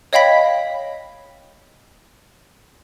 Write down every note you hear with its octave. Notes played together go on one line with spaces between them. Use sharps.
C#5 D#5 F5 G5 B5 B6